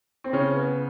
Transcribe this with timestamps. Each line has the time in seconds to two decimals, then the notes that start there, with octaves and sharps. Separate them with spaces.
0.24 C4
0.33 C#3 C#4
0.55 B3